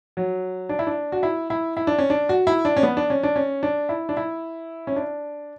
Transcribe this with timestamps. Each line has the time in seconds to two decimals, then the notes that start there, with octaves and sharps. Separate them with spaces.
0.17 F#3
0.69 D4
0.79 E4
0.87 D4
1.12 F#4
1.23 E4
1.50 E4
1.77 E4
1.87 D4
1.98 C#4
2.10 D4
2.29 F#4
2.47 E4
2.65 D4
2.77 C#4
2.83 B3
2.97 D4
3.10 C#4
3.23 D4
3.36 C#4
3.63 D4
3.89 E4
4.09 D4
4.17 E4
4.87 C#4
4.96 D4